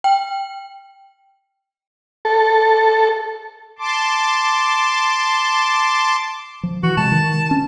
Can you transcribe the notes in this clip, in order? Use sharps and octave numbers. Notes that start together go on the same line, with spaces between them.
G5
A4
A5 C6 D6
F3
E3 F#4
C3 G#3 A5
D#3
C#4